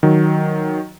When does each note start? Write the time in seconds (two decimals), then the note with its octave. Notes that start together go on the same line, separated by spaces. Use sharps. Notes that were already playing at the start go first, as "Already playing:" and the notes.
0.03 D#3 F#3